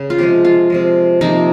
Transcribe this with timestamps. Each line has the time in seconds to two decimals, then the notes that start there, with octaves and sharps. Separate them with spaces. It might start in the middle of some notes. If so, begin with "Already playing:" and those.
Already playing: C#3
0.10 F4
0.18 C3 F3 G#3 G4
0.45 F4
0.70 C3 F3 G#3
1.21 C3 F3 A#3 D#4